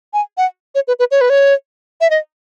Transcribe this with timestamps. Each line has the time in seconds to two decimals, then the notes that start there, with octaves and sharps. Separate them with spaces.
0.13 G#5
0.38 F#5
0.75 C#5
0.88 B4
0.99 B4
1.11 C#5
1.21 B4
1.30 C#5
2.01 E5
2.10 D#5